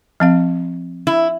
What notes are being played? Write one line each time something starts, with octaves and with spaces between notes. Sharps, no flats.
F3 C4 F5
E4